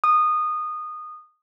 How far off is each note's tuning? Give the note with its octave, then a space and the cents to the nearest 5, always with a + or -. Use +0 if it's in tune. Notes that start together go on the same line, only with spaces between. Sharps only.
D#6 -20